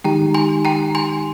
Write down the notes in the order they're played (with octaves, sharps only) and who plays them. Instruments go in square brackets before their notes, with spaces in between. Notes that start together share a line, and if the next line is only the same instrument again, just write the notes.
[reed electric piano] D#3 G#3 D#4 G4 [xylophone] G5 A#5
[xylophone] G#5 C6
G5 A#5
G#5 C6